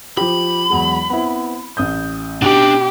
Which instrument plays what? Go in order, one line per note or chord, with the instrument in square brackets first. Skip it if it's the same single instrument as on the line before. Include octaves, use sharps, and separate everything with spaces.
[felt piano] F3 G4 [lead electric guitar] B5
[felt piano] E2 F#3 G#3
B3 C4 E4
A1 D#6 G6
[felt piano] B2 [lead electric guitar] D4 D#4 [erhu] G4